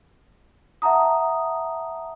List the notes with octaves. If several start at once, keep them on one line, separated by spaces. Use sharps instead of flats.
E5 F#5 A5 A#5 D#6